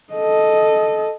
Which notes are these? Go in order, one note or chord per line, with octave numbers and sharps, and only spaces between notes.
A4 D#5